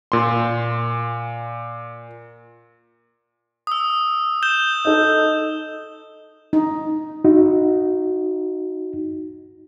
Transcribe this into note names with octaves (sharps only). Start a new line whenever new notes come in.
A#2 C6
D#6 E6
G6 E7 G7
D#4 A4
D#4
D#4 F#4